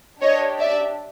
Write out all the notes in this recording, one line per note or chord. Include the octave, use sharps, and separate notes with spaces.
D4 G4 C#5 D#5
D5 E5